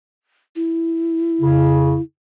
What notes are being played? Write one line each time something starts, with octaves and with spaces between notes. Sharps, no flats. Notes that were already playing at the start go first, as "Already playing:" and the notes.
E4
F2 C#3